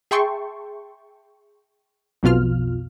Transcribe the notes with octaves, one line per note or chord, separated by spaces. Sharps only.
G#4 E5 G5 A5 C6 C#6
B1 F2 B2 F4 F6